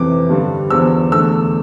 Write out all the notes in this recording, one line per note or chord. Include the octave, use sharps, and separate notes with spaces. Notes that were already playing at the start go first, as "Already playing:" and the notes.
Already playing: F2 C3 E3 D6
G2 D3 G3
E2 D3 F3 E6
E2 D3 A3 E6